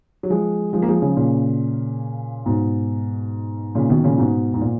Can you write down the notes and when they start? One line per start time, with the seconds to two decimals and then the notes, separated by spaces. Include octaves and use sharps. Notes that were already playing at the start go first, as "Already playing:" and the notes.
0.23 F#3
0.30 F3 G#3
0.73 F3 G#3
0.82 A#3
0.88 F3 G#3
1.02 C#3 F3
1.16 A#2 C#3
2.46 G#2 B2
3.75 A#2 C#3
3.90 B2 D#3
4.04 A#2 C#3
4.18 G#2 B2
4.54 G#2
4.61 A#2